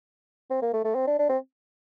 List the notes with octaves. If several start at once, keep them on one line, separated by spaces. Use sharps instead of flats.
C4
A#3
A3
A3
C4
D4
D4
C4